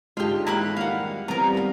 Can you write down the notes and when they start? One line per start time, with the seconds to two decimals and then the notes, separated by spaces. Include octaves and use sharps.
0.17 G#2 D3 G#3 F4 G4 D#5
0.47 D#2 E3 A#3 C#4 E5 B5 F#6
0.76 F2 D#3 G3 F5 F#5
1.28 E3 G3 B3 C4 F4 A#4 A#5
1.55 D#2 A4 F5